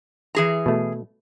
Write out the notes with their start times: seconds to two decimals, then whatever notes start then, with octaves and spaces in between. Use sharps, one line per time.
0.35 E3 G#4 A#5
0.66 B2 A3